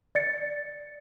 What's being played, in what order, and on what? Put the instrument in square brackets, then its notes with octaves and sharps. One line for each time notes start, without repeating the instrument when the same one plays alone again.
[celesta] D5 A6 C#7